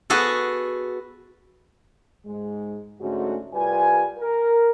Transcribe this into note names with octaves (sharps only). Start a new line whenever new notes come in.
B3 F#4 G#4 A4
G#2 G#3
G#2 D3 G#3 A3 C#4 F#4
C2 G3 F4 B4 G#5
A#4